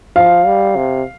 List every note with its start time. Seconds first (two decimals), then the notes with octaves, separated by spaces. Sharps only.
0.16 F3 F5
0.46 G3
0.76 C3